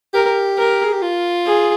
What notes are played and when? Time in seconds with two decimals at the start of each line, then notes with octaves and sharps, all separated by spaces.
0.14 G4 A#4
0.58 A#4
0.85 G#4
0.93 G4
1.02 F4
1.46 G#4